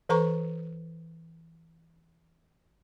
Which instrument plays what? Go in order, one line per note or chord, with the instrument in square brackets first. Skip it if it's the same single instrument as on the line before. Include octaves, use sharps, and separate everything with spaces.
[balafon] E3 A4 B4 A#5 C#6